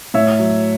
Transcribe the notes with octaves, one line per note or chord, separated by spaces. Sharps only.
A2 C#5 E5
F#3